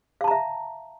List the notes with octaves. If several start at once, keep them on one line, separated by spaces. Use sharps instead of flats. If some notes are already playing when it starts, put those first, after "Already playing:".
E5 F5 A5 A#5